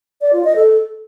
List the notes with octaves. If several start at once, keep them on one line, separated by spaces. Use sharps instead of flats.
D5
F4
D#5
A4